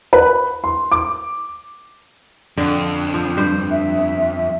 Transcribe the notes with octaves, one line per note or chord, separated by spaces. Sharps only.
B4
C6
D6
F2 D3
F3
G2 C5
E5